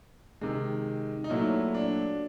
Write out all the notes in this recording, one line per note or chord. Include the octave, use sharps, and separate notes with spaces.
C3 D#3 G#3
D#4
A#2 F#3 A3 E4
D4